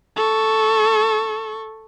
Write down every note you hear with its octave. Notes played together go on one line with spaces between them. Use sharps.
A4 C#6